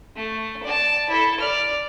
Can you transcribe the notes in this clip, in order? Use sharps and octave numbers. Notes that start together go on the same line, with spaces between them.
A3
D5 A5
E4 A4
D5 F6